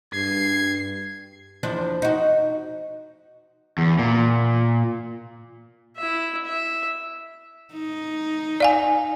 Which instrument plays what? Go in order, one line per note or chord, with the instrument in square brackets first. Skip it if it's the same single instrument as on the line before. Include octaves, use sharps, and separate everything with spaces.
[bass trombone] G2 [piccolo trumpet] G#6 [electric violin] C7
[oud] E2 F3 D4
D#4 F#4
[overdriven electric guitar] E2
A#2
[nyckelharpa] E4 E5
E5
[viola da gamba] D#4
[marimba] D5 F5 G#5